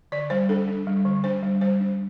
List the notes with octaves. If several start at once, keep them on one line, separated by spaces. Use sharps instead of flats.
D3 D5
G3 C5
D4 A4
D4
G3
D3
D4 C5
G3
G3 C5
D4